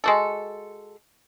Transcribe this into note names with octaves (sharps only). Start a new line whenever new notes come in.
G#3 F#4 A4